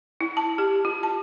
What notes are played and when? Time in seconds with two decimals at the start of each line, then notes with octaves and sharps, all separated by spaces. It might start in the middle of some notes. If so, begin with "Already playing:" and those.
0.21 E4
0.37 A5
0.58 G4
0.85 F4
1.03 A5